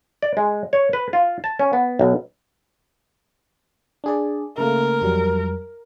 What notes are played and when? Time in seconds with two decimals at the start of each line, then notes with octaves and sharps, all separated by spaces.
0.22 D5
0.37 G#3
0.73 C#5
0.93 B4
1.13 F4
1.44 A5
1.59 C#4
1.73 B3
1.99 B1
4.04 D4 G#4 D5
4.58 C#3 A3 A#3 A#4
5.02 F2 F#3 G3